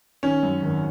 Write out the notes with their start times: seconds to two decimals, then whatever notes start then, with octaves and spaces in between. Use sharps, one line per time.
0.23 D#3 C#4
0.43 F#2
0.62 G#1